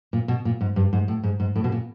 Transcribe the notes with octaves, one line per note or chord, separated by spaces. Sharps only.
A#2
B2
A#2
G#2
G2
G#2
A2
G#2
G#2
A2
B2
A#2